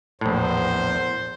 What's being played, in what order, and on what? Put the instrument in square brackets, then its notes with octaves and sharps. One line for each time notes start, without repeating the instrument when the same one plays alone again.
[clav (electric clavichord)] A#1 A2 [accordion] E2 [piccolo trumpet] C5